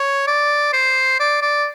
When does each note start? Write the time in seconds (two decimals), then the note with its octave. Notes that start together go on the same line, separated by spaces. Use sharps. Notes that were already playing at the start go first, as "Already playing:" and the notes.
Already playing: C#5
0.27 D5
0.73 C5
1.20 D5
1.42 D5